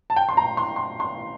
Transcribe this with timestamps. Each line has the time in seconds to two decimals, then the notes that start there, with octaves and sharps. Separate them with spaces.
0.10 A5
0.16 G5
0.29 C6
0.37 A#5
0.57 C6
0.76 C6
1.00 C6